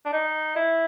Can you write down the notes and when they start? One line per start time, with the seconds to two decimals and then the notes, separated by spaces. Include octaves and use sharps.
0.05 D4
0.13 D#4
0.56 E4